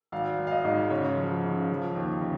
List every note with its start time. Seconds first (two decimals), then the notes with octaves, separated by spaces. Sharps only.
0.12 G#1 F5
0.38 G#1
0.47 F5
0.52 D#5
0.65 G#2
0.90 C#3 C#5
1.16 F3
1.43 C#3
1.70 F3
1.95 D#2
2.22 C#3